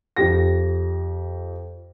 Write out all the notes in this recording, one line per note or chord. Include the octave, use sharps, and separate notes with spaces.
F2 G4 A#6